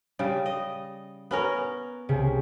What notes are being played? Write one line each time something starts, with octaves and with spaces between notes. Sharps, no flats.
C#3 G3
D#5
B3 C#4 A#4
C2 C#3